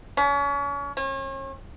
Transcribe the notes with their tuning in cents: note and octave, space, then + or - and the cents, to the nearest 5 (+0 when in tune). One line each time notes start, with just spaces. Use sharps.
C#4 +35
C#4 -40